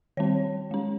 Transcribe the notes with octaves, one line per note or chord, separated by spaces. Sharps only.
D#3 G3 C4 C#5
G#3 C#4